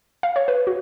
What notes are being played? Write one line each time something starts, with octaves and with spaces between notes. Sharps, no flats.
F5
C#5
B4
F#4